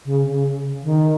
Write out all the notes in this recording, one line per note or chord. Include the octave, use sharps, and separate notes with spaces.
C#3
C#3
D#3